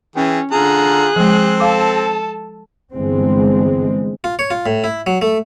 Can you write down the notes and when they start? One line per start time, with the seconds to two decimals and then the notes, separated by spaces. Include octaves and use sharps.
0.16 E3 C#4 G#4 G5
0.52 D3 F4 G#4 A#5 F#6
1.16 F3 G#3 C4
1.60 A4 F5 A5 D6
2.93 G1 E3 G#3 C4
4.24 F4
4.39 C#5
4.51 F4
4.66 A2
4.84 E4
5.07 F#3
5.22 A3